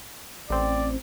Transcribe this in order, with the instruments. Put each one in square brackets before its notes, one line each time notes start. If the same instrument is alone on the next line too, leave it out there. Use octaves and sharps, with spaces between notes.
[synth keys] A1 C4 [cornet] D5